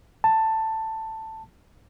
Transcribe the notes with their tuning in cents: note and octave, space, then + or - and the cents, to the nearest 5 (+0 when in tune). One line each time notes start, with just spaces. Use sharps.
A5 +10